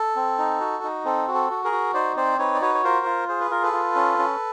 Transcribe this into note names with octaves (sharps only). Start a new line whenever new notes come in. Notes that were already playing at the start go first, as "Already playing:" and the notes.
Already playing: A4
C4
D#4
F#4
D#4
C4 A4
F#4
A4
F#4
G#4 A#4
F#4
D#4 C5 D5
C4 C5 D5
D#4 B4 C#5
D5
F#4 B4 C#5
C#5
F4 A#4 C5
F4
G#4 C5
B4
F4 A#4
A4 B4
F4
C#4
C#4